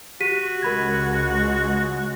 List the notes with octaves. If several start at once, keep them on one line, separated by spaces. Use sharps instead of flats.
F#4 G4 B6 D#7
C#2 G#3 A#4 B5 G#6